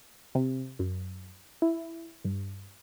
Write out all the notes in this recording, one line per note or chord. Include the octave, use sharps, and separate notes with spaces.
C3
F#2
E4
G2